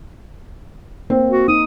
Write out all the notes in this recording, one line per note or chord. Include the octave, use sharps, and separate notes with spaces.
A#3 C4
F#4
D#4 D#6